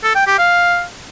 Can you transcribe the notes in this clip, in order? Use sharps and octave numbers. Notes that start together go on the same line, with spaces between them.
A4
G5
G4
F5